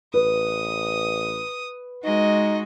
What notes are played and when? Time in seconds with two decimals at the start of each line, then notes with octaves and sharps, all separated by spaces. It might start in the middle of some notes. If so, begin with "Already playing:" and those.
0.14 A1 B4 D#6
2.04 G#3 D#4 F#4 D#5